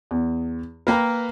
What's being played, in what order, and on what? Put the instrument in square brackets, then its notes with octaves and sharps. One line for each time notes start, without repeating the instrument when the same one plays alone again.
[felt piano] E2
[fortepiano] A#3 A#4 [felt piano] B4 G5 A#5